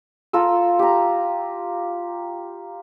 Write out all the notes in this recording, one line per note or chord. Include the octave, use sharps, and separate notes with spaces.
F4 A4 A#5 E6
G4 A#5